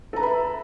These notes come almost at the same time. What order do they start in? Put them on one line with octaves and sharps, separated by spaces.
A4 A#5 B4 B5 E5